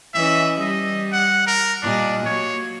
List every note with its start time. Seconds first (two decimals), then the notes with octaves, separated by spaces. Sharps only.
0.14 E3 C#4 D#5 E5
0.60 G3 D#5
1.13 F#5
1.47 A#4
1.83 A#2 G3 D4 D#5
2.26 F#3 A#3 C#5